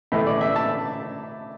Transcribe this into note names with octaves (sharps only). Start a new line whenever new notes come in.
A2 E3 A3
D5
E5
A5